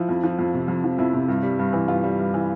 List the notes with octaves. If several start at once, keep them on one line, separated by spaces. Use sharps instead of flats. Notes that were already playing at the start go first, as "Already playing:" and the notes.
Already playing: F3 E4
F2
F3
F2
C3
F2
F3
F2 E4
C3
G2
G3
G2
E3
G2 F4
G3
G2
E3